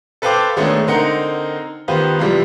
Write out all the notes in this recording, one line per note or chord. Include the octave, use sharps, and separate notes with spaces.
A4 B4 C5 F5 G5 D6
D#3 G#3 A3 B3 C#4 D4
D3 C4 D#4 A#4 F#5 C#7
D#3 B3 F4 G4 B4 C5
G#2 C3 E3 F3 G3 G#3